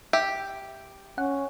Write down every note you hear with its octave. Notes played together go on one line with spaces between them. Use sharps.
G4 E5
C#4 F#5